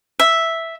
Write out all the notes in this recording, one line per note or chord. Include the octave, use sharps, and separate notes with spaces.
E5